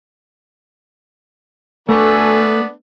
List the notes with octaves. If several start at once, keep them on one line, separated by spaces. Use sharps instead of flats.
D2 A3 B3 D4 A4 B4 G#5